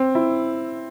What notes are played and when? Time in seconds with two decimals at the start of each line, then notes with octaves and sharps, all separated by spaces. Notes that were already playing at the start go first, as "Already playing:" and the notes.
Already playing: C4
0.15 E4